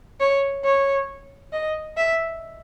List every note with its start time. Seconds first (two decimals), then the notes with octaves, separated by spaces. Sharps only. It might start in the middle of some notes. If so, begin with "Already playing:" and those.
0.20 C#5
0.64 C#5
1.53 D#5
1.97 E5